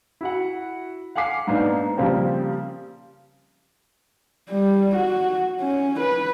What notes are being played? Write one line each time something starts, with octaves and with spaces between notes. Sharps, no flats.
E4 F#4 F#5
F5 F#5 G#5 D6 C7
G#2 A#3 B3 D4 D#4
C#3 F3 G3 A#3 C4
G3
F#4
C#4
B4